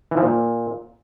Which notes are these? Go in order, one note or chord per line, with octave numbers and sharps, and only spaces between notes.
E3
F3
A#2